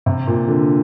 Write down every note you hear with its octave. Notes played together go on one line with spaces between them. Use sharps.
C3
A#2
D3